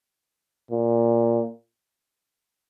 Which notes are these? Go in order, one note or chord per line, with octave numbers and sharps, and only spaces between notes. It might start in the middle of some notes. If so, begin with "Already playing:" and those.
A#2